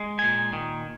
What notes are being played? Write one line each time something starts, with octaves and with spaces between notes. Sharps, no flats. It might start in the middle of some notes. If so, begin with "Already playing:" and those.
Already playing: G#3
A#2 G#5
D#3